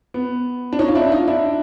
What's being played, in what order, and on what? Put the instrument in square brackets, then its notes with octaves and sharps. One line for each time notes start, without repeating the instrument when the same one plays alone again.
[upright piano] B3
D4
C#4 D#4
F4
D4 E4
D#4 F4
D4 E4